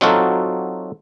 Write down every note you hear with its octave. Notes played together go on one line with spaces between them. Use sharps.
F#3 C4 D#4 F4 F#4 A4